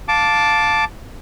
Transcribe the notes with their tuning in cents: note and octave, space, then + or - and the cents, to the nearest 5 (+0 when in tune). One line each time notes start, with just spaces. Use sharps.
F5 +15 A5 +0 D6 -5